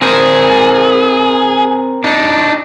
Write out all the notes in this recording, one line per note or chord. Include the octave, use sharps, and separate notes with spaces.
C4 G#4 A#4 C5
D4 D#4